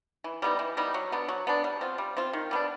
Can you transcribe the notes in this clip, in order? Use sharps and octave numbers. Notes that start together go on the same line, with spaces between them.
E3
G3 B3 D#4
E3
G3 B3 D#4
F#3
B3 D4
F#3
B3 D4
G3
C4 F4
G3
C4 F4
D#3
G3 B3 D4